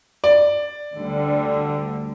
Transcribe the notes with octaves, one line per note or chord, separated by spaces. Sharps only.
D5
D2 D3 G3